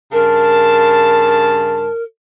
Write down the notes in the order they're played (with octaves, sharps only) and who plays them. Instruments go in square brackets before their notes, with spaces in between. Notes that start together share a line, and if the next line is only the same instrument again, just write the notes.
[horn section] G2 C#3 A5 [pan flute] A#4